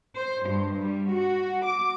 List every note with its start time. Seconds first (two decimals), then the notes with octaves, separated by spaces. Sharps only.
0.17 C5
0.46 G2
0.80 G3
1.13 F#4
1.66 D6